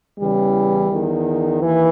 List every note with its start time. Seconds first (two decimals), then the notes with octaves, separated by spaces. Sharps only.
0.19 E2 C#3 E3 G3
0.91 E2 D#3
1.61 D#2 E3